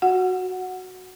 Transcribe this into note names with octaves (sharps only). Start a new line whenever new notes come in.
F#4 F#5